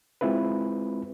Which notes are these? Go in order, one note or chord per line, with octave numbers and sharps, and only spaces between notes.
G#3 C4 E4 F4 B4